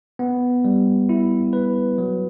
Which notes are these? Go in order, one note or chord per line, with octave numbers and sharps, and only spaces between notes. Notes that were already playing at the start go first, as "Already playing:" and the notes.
B3
G3
E4
B4
F#3